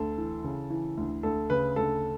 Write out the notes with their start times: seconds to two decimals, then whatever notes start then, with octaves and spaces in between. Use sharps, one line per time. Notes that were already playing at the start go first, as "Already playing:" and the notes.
Already playing: D2 A4
0.18 E3
0.44 C#3
0.70 E3
0.97 D2
1.23 D2 A4
1.50 C#3 B4
1.76 D2 A4